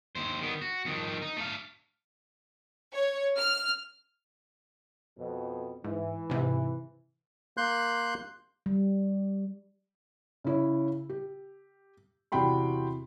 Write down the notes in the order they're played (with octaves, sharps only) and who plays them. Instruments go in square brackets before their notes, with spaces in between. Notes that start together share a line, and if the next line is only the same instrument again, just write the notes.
[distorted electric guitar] D#2 C5
D#3 B3
F#4
F2 D#3
D#4
A3 F5
[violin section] C#5
F6
[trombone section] F2 B2
[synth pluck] G#2 [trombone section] E3
[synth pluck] G#2 C3
[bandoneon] A#3 C6 F#6 G6
[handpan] G3
[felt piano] C#3 E4 C#5
G4
E2 C3 F#4 G5 B5 C6